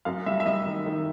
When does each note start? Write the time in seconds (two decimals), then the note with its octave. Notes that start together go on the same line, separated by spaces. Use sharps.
0.05 F#2 F5
0.26 G3 E5
0.40 E5
0.46 G3 D#5
0.67 D#3
0.86 D#3